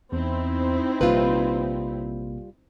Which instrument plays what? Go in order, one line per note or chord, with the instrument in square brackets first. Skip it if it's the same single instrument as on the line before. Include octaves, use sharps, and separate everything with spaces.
[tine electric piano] E2 [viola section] C4 D#4 E4
[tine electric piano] A#1 C3 A#3 [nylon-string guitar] G3 F4 B4